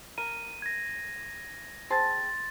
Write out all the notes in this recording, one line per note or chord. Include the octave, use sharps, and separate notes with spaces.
A#4 D#7
G#6 A#6
C4 G#4 A5 C6 A6